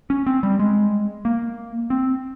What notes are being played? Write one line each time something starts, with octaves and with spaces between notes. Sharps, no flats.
C#4
C4
G3
G#3
A#3
C4